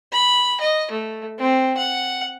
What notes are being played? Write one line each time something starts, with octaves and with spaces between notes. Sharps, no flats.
B5
D#5
A3
C4
F#5